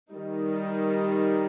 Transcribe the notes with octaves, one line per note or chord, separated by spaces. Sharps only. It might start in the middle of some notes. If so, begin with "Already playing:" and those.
D#3 G3 D#4